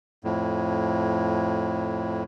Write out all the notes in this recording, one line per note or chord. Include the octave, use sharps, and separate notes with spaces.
F2 A2